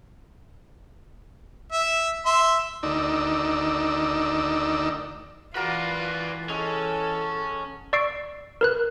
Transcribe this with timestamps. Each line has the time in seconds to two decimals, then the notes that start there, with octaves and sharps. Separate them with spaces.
1.72 E5
2.26 E5 C6
2.83 D2 D#3 D#4 D5 E6
5.55 E3 F4 F#4 A#4 B4 D5
6.50 G#3 C#4 A4
7.93 D5 C#6 E6 C7 D7
8.61 A#4 B4 F#6